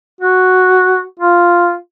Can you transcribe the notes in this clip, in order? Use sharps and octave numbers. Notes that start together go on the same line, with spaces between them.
F#4
F4